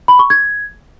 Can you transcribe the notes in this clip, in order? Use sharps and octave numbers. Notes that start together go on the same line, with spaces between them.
B5
C#6
G#6